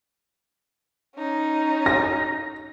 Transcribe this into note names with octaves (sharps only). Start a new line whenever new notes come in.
C#4 D#4
A#6